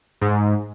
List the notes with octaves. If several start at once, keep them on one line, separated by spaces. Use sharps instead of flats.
G#2